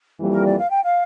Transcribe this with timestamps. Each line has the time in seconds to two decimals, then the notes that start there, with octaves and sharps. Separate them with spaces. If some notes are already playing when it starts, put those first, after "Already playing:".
0.18 F2 E3 G3 A#3
0.32 A#4
0.44 D5
0.57 F5
0.70 G5
0.84 F5